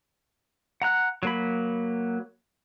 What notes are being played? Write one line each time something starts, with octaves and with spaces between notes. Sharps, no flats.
F#5 A#5 F#6
F#3 A#3 B5